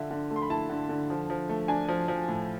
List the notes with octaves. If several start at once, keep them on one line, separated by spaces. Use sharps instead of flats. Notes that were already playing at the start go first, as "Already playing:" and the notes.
Already playing: D3 F4 E5
D3
A3
C6
B5
E4 A5
D3
D3
F3
F3
A3
D4 G#5
F3
F3
A2